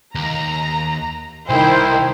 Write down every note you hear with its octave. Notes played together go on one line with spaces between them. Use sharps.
D#2 A#5
C2 D#3 E4 C5 G5